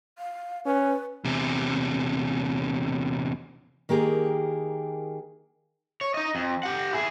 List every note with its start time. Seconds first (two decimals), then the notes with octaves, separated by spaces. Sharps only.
0.19 F5
0.65 C#4 B4
1.25 E2 C3
3.89 D#3 A#3 G4 G#4
6.01 C#5
6.14 D#4 D#5
6.35 F2
6.63 G4 F#5
6.93 E4 G#4